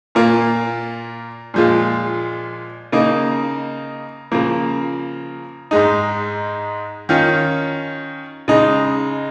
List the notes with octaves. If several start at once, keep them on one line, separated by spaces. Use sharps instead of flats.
A#2 A#3 F4
A#2 F3 G#3 F4
C#3 A#3 D#4
C#3 F3 A#3
G#2 G#3 D#4
D#3 C#4 F4
C#3 G#3 D#4